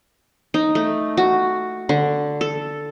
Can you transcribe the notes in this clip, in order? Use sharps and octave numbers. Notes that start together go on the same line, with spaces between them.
D#4
A3
F#4
D3
A4